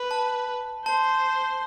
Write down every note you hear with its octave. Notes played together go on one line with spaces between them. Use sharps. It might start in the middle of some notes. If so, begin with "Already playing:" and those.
Already playing: B4
A5
C5 A5